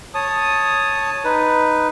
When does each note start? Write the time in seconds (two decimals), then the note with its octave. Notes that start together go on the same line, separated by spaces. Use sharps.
0.14 C#5 A5 D#6
1.24 D#4 B4